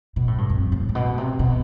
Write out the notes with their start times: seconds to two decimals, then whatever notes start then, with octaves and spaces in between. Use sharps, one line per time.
0.16 B2
0.28 A2
0.38 G2
0.50 F2
0.72 A2
0.89 A2
0.95 B2
1.18 C3
1.39 B2